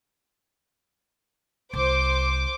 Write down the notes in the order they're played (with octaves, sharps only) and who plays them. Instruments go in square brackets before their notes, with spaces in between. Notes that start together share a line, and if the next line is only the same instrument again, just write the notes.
[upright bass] C2 [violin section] C5 D6